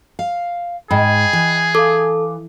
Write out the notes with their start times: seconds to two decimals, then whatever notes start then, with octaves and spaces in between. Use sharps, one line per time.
0.19 F5
0.91 G#2 G#4 D#5 G5 B5
1.33 E3
1.75 A4 F5 D6